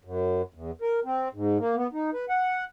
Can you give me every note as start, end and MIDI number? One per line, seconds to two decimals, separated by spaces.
0.04 0.42 42
0.54 0.71 40
0.82 1.00 70
1.05 1.28 60
1.34 1.58 44
1.58 1.76 58
1.76 1.87 59
1.93 2.10 63
2.14 2.25 71
2.29 2.65 78